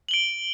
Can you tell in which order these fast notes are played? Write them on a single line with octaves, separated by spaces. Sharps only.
F#7 G7 D7